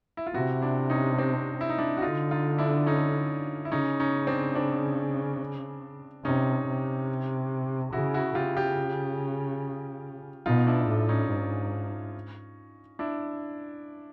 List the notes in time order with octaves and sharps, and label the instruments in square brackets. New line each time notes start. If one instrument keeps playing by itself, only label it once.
[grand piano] E4
F4
[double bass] C3 [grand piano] E4 F#4
[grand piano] D4 E4
C#4 D#4
C4 D4
E4
D#4
D4 E4
F#4
[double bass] D3 [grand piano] D#4 F4
[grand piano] D#4 F4
D4 E4
C#4 D#4
E4
[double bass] C#3 [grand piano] C#4 D#4
[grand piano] C#4 D#4
C4 D4
C4 D4
[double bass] C3 [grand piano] C#4 D#4
[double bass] C3
[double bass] C#3 [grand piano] E4 F#4
[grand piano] E4 F#4
[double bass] C#3 [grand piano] F4 G4
[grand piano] F4 G4
[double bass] B2 [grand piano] D#4 F4
[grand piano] D4 E4
[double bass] A2
[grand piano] C#4 D#4
[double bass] G#2
[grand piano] D4 E4